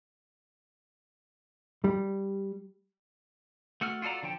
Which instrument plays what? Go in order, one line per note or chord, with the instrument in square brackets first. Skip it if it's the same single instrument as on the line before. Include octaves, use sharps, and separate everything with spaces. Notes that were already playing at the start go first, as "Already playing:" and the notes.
[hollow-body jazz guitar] G3
[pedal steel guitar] A3 F#4 A4 F6
F4 F#4 A4 D5 A#5
D3 F3 C#5 G5 A5